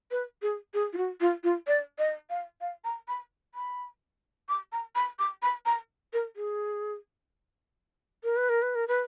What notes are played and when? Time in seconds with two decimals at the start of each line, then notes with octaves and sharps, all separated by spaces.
0.11 B4
0.42 G#4
0.74 G#4
0.93 F4
0.97 F#4
1.21 F4
1.44 F4
1.67 D5
1.99 D#5
2.30 F5
2.61 F5
2.84 A#5
3.08 B5
3.55 B5
4.49 D6
4.72 A#5
4.95 B5
5.19 D6
5.42 B5
5.66 A#5
6.13 A#4
6.36 G#4
8.24 A#4
8.37 B4
8.49 A#4
8.62 B4
8.75 A#4
8.88 B4